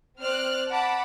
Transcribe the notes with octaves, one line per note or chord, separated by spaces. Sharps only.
C4 C5 D5 F6 F#6
F#5 A5 B5 D6